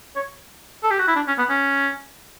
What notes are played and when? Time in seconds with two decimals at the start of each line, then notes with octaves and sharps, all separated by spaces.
0.16 C#5
0.83 A4
0.91 G4
0.99 F#4
1.08 E4
1.16 D4
1.28 C#4
1.38 B3
1.50 C#4